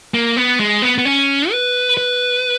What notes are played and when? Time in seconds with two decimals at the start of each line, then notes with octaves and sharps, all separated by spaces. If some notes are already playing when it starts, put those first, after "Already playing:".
0.14 A#3
0.37 B3
0.60 G#3
0.82 B3
0.98 B3
1.05 C#4
1.51 B4
1.97 B4